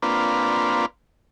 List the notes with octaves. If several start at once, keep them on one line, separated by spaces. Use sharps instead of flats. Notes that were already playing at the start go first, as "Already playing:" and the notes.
A#3 C4 D4 F4 B4